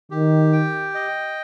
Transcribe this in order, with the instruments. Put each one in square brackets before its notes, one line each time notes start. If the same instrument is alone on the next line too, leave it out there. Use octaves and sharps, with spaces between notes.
[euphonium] D#3 [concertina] G4
[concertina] G5
D#5